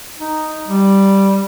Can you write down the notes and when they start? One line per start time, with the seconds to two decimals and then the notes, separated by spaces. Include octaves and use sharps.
0.20 D#4
0.68 G3